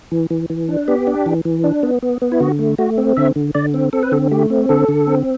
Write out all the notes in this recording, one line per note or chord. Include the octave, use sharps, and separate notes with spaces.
E3
E3
E3
D4
B3 G4
D4
E3
E3
D4
B3
B3
B3
E4
D3 F#4
A3
A3 F#4
C4
D3 E5
D3
D3 D5
C4
C4 A4
B4
D3 A4
A3 G4
C4
D3 A4
D3
C4